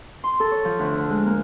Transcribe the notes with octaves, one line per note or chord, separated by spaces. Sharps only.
C6
A4
C#5
F3
D2
D3
G#3
A#3